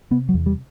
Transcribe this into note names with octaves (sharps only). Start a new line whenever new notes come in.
C3 B3
F#3
E2
G3